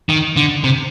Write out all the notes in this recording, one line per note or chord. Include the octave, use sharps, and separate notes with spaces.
D#3
D3
C3